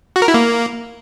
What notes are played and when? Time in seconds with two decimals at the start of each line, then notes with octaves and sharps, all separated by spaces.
0.16 F#4
0.22 A#4
0.28 E4
0.34 A#3